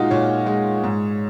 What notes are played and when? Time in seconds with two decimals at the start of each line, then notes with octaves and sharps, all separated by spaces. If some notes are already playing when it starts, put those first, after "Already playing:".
Already playing: A#2 G#3 D#4 F4 F#4 F5
0.11 A#2 C#5
0.46 G#3
0.84 G#2